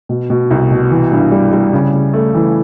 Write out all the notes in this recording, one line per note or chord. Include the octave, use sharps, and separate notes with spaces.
B2
B2
C2
B2
E3
G2
G3
G3
C#3
C#3
A3
E3